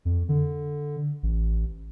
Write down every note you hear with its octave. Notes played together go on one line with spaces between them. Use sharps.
F2
D3
A1